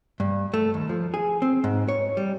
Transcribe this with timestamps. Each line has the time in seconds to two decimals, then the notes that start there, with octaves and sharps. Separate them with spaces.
0.20 G2
0.54 A3
0.74 D#2
0.89 F3
1.14 G#4
1.42 C4
1.64 G#2
1.88 C#5
2.17 G3